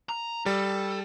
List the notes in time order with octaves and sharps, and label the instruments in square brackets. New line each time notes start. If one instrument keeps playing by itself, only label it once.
[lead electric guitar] A#5
[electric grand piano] G3 [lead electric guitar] A4